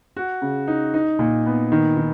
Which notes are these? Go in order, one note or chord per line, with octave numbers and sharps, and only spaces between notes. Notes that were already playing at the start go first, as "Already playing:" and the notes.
F#4
C#3
D#4
D#4
A#2
B3
D#3
D#3